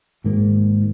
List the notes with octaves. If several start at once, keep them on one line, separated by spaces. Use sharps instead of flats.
G#1 G#2 D#3 A#3